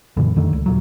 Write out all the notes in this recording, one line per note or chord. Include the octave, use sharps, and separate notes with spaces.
F#2 A#2 D3 E3
F2 D3 D#3 A3
C#2
D#2 A#2 F#3